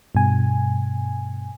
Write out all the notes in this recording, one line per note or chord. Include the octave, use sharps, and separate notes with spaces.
G2 B2 G#5